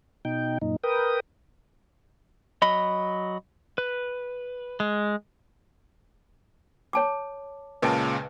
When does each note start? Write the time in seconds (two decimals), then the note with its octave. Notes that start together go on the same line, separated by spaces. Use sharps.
0.25 B2 D#4 G5
0.62 F#2 A#2 D#4
0.83 A#4 B4 G5 D#6
2.62 F#3 D#5 B5
3.78 B4
4.80 G#3
6.93 C#5 A5 D6
7.82 C#2 A#2 C#3 B4 D#5 A5